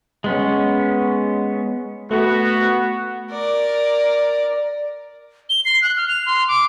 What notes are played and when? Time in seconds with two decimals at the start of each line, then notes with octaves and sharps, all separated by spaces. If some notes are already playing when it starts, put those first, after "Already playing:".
0.24 G#3 B3 C#4
2.11 A3 B3 F#4
3.31 A#4 D5
5.49 G7
5.65 C7
5.82 F#6
5.97 F6
6.08 F7
6.26 C6
6.48 D6